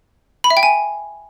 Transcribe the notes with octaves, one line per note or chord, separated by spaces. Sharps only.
B5
E5
G5
G#5